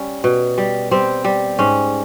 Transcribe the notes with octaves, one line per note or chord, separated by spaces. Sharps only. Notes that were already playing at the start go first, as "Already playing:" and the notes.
Already playing: G3 C#4
B2
G3
G3 C4
G3
G#2 C#4